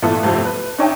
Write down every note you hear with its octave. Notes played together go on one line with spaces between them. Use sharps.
A#2 E3 A3 B3 A4
F2 A2 C3 F3
B4
D4 D#4 C#5 E5 G5 A5